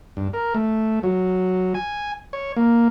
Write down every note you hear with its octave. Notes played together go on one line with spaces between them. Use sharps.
G2
A#4
A3
F#3
G#5
C#5
A#3